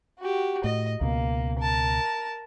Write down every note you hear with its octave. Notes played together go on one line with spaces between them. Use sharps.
F#4 G4
A2 D#5
C#2 B2 A#3
A#4 A5